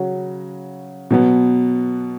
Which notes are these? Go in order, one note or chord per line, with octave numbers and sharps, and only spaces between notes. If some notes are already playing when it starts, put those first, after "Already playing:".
Already playing: C#3 F#3 C#4 F#4
B2 F#3 B3